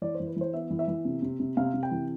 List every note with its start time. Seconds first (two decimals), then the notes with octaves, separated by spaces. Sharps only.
0.02 E3 D5
0.15 C5
0.20 E3
0.27 B4
0.36 E3 C5
0.54 B3 E5
0.70 E3
0.79 E5
0.88 E3
1.05 C3
1.22 C3
1.40 C3
1.57 C3 F5
1.74 C3
1.83 G5
1.91 E3